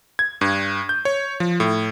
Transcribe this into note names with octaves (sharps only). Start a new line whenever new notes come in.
G#6
G2
G6
C#5
F3
A2